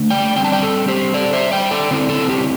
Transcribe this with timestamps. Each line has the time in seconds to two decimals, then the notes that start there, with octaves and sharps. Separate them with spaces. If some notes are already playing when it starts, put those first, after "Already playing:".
Already playing: D3 A3 D4
0.10 D5 G5
0.36 D3 G3 C4 G5
0.44 A5
0.52 D5 G5
0.63 A4
0.88 G4 C5
1.14 A4 D5
1.33 C5 E5
1.52 D5 G5
1.71 A4 D5
1.91 D3 C4 E4 A4
2.09 A4
2.30 G4